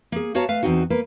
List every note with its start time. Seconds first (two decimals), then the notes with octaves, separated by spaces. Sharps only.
0.12 A#3 G#4
0.34 B3 F#4 C#5 F5 A5 A#5
0.49 A3 B4 F5
0.63 E2 C3 C4 D#4 F#4
0.90 A#3 B4